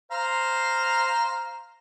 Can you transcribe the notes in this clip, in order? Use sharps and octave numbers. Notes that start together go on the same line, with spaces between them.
C5 F5 A#5